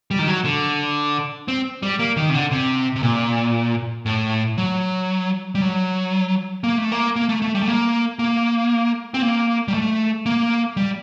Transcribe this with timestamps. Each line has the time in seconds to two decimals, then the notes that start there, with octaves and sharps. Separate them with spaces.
0.11 G3
0.19 D#3
0.28 F#3
0.45 D3
1.48 C4
1.83 G3
1.99 A#3
2.17 D#3
2.29 C3
2.34 D3
2.51 C3
2.96 C3
3.03 A#2
4.06 A2
4.58 F#3
5.55 G3
5.61 F#3
6.64 A#3
6.78 A3
6.92 A#3
7.16 A#3
7.29 A3
7.42 A3
7.55 G3
7.62 A3
7.68 A#3
8.19 A#3
9.14 C4
9.22 A#3
9.68 G3
9.74 A3
10.26 A#3
10.77 G3